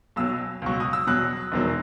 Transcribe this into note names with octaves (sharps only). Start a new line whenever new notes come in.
B1 B2 F#3 E6
C#2 B2 F#3 C#6
D#6
E6
E2 B2 F#3 F#6
E1 E2 D#3 F#3